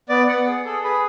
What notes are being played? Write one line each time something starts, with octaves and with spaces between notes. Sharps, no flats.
B3 D5
B3 F#5
G#4
G#4 A4
G#4 B4